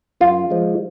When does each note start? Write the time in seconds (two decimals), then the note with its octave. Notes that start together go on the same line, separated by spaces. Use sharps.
0.20 F#2 F4
0.50 F3 G#3